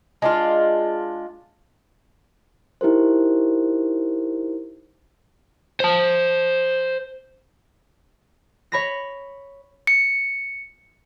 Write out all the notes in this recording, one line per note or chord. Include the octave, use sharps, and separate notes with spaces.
G#3 D4 F4
D#4 E4 G4 A#4 C5
C5 A5
C#5 B5 A#6
C#7